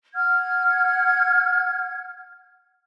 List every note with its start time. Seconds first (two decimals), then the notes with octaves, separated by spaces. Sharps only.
0.13 F#5 F6 G#6